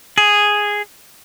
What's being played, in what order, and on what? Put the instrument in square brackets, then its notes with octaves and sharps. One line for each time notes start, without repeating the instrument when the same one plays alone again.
[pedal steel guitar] G#4